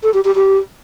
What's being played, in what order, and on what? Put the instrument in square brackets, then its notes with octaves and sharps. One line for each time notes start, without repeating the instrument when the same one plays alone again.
[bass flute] A4
G4
G4
G4